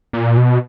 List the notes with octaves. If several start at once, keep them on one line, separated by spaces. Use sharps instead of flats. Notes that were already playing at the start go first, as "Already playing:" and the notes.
A#2
B2